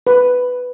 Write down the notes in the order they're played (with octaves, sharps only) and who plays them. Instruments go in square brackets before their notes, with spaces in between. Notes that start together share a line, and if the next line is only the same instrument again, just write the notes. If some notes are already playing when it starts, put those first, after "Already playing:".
[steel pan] B4